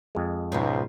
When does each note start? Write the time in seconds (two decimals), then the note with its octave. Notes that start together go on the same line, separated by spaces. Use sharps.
0.15 F2 G#3
0.52 C#2 G#2 B2 F3